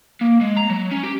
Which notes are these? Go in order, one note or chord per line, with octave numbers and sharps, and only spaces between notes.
A#3
G#3
A#5
F#3
C#4
G4